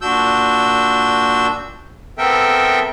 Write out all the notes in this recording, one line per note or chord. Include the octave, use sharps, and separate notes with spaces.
A#2 D4 F#4 E6 G6
B3 C4 A4 A#4 E5 G5